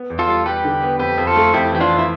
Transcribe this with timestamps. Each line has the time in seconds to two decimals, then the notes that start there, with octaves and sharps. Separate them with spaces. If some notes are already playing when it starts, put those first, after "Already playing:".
Already playing: B3
0.10 E2
0.19 F4 A4
0.28 G3
0.46 G3 G4 B4
0.64 D3
0.82 B3
1.00 F2 G4 B4
1.17 F2
1.27 F4 A4
1.36 A3
1.53 F2 E4 G4
1.72 E3 G4
1.80 D4 F4
1.89 E3
1.99 E4